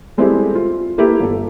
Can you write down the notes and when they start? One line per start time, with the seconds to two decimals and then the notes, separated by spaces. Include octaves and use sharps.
0.17 G3 G#3 C4 E4 G4 A4
0.55 F4
0.98 A#3 E4 G4 A4 B4
1.20 G1 A4